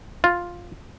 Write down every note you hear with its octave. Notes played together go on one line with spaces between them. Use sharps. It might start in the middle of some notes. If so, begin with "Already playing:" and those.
F4